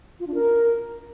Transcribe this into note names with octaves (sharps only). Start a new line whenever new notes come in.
F4
D4
A#4